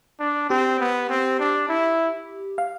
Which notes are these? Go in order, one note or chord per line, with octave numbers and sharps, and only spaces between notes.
D4
C4 G4
B3
C4
D4
E4
F5